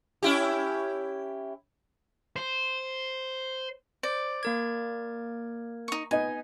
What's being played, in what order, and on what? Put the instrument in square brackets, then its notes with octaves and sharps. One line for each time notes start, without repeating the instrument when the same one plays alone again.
[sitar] C#4 E4 G4
[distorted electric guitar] C5
[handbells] C5 [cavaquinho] D5
[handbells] A#3 A#4 G#6
[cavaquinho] D#4 C#6
[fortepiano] B3 D#4 D#5 [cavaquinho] G#5